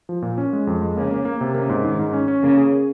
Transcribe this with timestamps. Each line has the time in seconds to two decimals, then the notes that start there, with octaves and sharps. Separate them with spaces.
0.09 F3
0.22 A#2
0.38 C#4
0.53 G#3
0.67 F2
0.82 G#3
0.96 C#3 A#3
1.11 A#3
1.25 A#3
1.41 C3
1.54 C#3 A#3
1.69 G#2
1.84 G#2 D#3
1.99 G#2
2.13 C#4
2.28 C#4
2.43 C#3 A#3
2.58 G#4